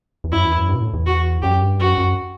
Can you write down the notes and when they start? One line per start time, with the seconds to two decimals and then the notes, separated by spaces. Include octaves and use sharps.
0.24 E2
0.32 F#2 E4
0.44 E2
0.57 F#2
0.69 G2
0.75 B2
0.81 A2
0.94 E2
1.06 F#4
1.42 F#2 G4
1.61 G2
1.79 F#2 F#4
1.98 F#2